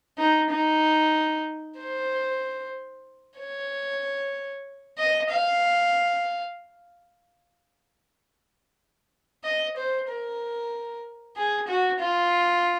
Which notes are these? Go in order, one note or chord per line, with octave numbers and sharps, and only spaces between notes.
D#4
D#4
C5
C#5
D#5
F5
D#5
C5
A#4
G#4
F#4
F4